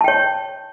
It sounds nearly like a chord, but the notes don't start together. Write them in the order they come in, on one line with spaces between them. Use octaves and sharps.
A5 G5 C#5